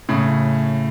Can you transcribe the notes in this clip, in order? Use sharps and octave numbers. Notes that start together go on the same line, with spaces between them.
A2 C#3